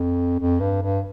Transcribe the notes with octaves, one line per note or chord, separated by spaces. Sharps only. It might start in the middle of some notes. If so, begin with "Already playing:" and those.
Already playing: F2
F2
G2
G2